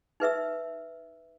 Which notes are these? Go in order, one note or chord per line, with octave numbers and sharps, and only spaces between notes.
D#4 B4 E5 E6